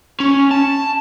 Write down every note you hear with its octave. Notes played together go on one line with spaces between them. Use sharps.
C#4
A5